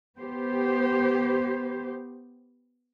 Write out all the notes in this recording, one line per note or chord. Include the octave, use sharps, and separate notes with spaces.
B3 G4 C5